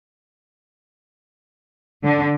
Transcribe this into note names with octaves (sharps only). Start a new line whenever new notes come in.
D3